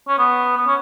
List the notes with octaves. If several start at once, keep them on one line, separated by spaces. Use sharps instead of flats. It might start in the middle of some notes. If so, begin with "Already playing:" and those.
C#4
B3
B3
C#4